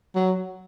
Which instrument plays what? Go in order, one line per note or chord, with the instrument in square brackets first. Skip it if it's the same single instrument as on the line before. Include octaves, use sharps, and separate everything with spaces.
[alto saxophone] F#3